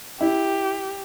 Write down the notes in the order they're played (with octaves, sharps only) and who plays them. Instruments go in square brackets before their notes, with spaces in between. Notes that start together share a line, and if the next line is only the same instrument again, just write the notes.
[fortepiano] E4 [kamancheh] G4